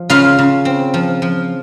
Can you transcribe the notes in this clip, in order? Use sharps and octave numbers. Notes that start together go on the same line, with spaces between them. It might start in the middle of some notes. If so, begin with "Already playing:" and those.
Already playing: F3
C#3 F4 F5
C#3
C4
F3
F3